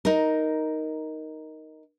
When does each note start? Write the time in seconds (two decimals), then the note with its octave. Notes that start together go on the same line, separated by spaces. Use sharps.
0.05 D#4 A#4